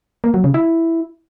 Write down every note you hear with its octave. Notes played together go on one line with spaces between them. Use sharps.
A#3
F#3
C#3
E4